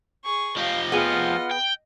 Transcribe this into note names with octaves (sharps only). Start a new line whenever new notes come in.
G#4 C#6
F3 G4 D#5 F5
B3 F4 G#4 F#5 F6
G5